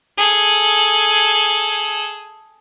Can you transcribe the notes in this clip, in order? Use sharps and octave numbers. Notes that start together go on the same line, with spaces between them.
G#4 A4